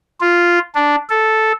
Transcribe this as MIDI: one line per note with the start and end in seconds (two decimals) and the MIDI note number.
0.21 0.59 65
0.75 0.96 62
1.09 1.52 69